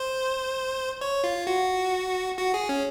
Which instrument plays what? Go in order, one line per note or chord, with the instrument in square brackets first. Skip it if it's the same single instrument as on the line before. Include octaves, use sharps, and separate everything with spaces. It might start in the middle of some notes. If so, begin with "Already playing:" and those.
Already playing: [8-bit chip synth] C5
C#5
F4
F#4
F#4
G#4
C#4